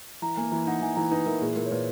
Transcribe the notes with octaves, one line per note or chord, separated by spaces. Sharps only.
E3 A#5
A#3 G#5
E3 A#5
D#4 F#5
E3 G#5
E3 A#5
D#4 B4
E3 A#4
A#2 G#4
A#2 A#4
C#5
A#2 B4